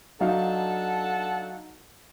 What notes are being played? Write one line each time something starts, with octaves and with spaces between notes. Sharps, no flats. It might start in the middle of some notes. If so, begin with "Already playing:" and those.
F#3 D4 D#4 A4 F5 F#5